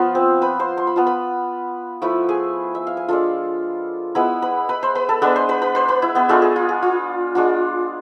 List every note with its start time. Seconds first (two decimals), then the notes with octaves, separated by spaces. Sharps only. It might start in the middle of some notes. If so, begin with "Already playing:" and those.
Already playing: F3 B3 F4
0.15 C4 C5
0.42 B4 B5
0.59 C5 C6
0.77 C6
0.87 B5
0.96 B3 F4 A5
1.06 B4 B5
2.02 F3 A3 E4 B4 B5
2.29 G#4 G#5
2.75 E5
2.87 F5
2.97 G#5
3.08 G#3 D4 F4 A4 A5
4.15 G#3 B3 E4 B4 B5
4.42 B4 B5
4.69 B4 B5
4.83 C5 C6
4.95 B4 B5
5.09 A4 A5
5.22 G#3 B3 D4 B4 B5
5.36 C5 C6
5.49 B4 B5
5.62 B4 B5
5.75 C5 C6
5.88 B4 B5
6.02 E4 E5
6.15 B3 B4
6.29 G#3 A3 D4 F4 A4
6.42 G#4
6.56 F4
6.69 G#4
6.82 F4
7.35 G#3 D4 F4